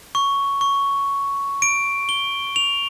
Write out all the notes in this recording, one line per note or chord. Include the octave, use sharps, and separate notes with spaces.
C#6
C#6
D7
G7
F7